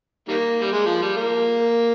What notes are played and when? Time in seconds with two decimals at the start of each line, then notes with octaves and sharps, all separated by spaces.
0.28 D#3 G3 A#3
0.62 G3
0.72 G#3
0.86 F3
1.02 G3
1.17 A#3